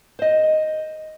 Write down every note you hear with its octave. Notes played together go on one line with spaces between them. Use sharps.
C5 D#5